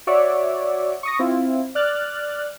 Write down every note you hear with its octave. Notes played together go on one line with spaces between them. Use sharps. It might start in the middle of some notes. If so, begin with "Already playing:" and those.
F#4 C#5 D5 E5
C#6 D#6 A#6
C4 E4 F4
D5 F6 F#6 A6